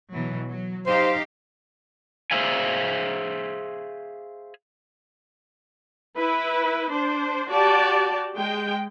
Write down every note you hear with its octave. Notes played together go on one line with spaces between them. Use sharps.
B2 E3 F#3
F#3
D#4 G4 C5 F5
G#4 A4 C5 E5 F5 G#5
E4 B4
D4 C5
F#4 G4 D5 A5
G#3 G5